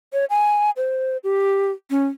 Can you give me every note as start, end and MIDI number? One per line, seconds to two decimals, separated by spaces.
0.13 0.25 73
0.30 0.70 80
0.77 1.17 72
1.24 1.71 67
1.91 2.07 61